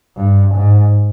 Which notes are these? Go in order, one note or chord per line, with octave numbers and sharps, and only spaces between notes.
G2
G#2